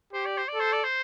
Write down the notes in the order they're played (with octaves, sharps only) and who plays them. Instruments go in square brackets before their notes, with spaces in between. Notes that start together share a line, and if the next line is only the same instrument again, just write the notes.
[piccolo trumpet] G4 [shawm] C5
[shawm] D5
C5
D5
[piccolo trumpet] A4
[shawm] C5
D5
C5